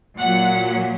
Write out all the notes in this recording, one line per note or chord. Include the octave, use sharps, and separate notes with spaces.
A#2 F#3 F#5